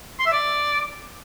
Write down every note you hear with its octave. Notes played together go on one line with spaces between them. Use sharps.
C6
E5
D5